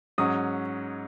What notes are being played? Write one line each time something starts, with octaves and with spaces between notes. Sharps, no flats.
G#2 F#3 C#4 D#6